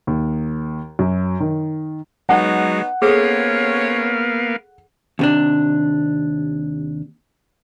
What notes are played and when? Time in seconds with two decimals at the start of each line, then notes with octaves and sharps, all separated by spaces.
0.07 D#2
0.99 F#2
1.40 D#3
2.29 F#3 G#3 B3 C#4 D#4 F#5
3.02 A#3 B3 C#4 G#4 A4 C5 C#5 F5
5.19 D#2 C3 D4